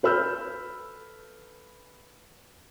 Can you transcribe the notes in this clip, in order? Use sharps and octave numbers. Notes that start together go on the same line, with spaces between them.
A4 B4 B5 E6 F6 G6